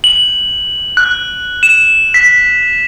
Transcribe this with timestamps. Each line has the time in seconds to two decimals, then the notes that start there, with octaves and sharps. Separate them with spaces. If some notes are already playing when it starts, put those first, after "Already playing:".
0.04 F#7
0.97 F#6
1.63 E7
2.14 B6